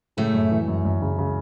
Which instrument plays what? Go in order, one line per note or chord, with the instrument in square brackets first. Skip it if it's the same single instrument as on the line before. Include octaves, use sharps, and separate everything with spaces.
[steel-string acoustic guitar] A2 A3 [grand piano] C#3
[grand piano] F#2
E3
F#2
F#2
C#3
C#3